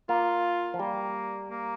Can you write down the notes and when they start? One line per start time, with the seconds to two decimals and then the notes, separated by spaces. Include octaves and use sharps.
0.09 A#3 F4
0.74 F3
0.79 G3 A#3
1.51 A#3